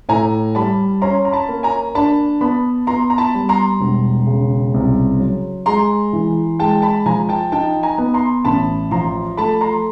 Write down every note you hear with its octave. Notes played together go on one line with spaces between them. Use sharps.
A2 G#5 A#5
G3 A5 B5
C#4 A#5 C6
A#5
A5 B5
A#3
G#5 A#5
D4 A5 B5
B3 A5 B5
B3 A#5 C6
A#5
A5 B5
G3
A#5 C6
E1
C#3
C2
F#3
G#3 A#5 C6
E3
G#3 G5 A5
A5 B5
F3 G#5 A#5
G5 A5
D#4 G5 A5
G#5 A#5
B3
A#5 C6
A1 A5 B5
F3 A#5 C6
A3 A5 B5
A#5 C6